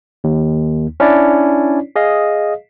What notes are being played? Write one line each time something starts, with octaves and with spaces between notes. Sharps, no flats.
D#2
C#4 D4 E4 C#5 D5
G#4 D#5 F5